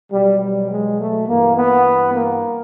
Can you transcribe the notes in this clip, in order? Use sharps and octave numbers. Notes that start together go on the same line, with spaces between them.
B2 F#3 G3
G3
G#3
A3
G2 E3 A#3
B3
A#3